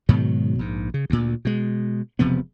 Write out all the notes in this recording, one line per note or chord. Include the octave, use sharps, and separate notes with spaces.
G#2 B2 D#3 F#3
A#1 G#2
C#3
D2 A#2
B2 G#3
E1 C3 F3 B3